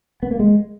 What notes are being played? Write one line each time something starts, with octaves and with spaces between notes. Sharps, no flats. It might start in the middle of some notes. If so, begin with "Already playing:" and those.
B3
A#3
G#3